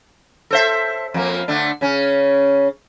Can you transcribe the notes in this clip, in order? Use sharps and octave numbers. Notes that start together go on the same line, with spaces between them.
A4 C5 E5
F2 A#3
D3 A3 D4
C#3 C#4